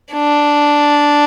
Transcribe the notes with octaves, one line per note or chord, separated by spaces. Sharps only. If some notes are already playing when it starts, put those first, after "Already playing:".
D4